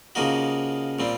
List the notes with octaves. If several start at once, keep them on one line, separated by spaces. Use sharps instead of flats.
C#3 F3 A#3 D#4 F#4
A#2 G3 C4